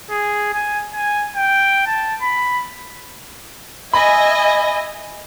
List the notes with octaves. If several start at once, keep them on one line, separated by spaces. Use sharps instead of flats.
G#4
G#5
G#5
G5
A5
B5
D#5 E5 G#5 B5